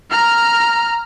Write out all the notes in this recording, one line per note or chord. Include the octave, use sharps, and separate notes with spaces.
A#5 F6